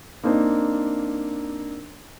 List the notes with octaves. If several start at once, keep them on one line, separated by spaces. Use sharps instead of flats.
A#3 C4 D4 D#4 C5